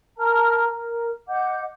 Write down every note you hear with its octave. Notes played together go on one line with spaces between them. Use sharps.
A#4 A5 A#5 F6
A#4
D#5 F#5 D6 G6